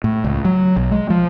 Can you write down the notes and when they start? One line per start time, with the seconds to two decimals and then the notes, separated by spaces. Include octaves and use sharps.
0.04 A2
0.24 C#2
0.45 F#3
0.76 B1
0.91 G#3
1.10 F3